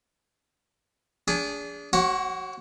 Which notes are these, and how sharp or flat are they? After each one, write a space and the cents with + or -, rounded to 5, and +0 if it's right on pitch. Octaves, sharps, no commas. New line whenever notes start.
D4 -30 G#4 -10
F#4 +30 C#5 -35 F#5 -10